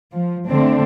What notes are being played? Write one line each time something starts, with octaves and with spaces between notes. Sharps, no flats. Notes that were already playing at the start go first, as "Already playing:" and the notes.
F3
D3 A3 C4 D4